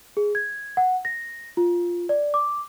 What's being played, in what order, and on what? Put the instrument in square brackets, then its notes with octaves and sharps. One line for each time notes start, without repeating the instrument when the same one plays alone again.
[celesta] G#4
G#6
F#5
A#6
F4
D5
D6